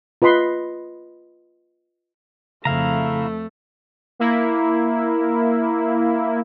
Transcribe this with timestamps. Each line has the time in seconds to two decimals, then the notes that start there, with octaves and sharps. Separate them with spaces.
0.22 F4 B4 D#5 B5 C6
2.65 F2 C#3 A3 E4 F5 A#5
4.19 A#3 E4